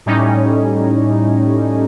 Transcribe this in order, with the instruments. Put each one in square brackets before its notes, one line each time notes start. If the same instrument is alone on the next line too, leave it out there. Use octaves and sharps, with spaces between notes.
[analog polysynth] A2 G3 C#4 D#4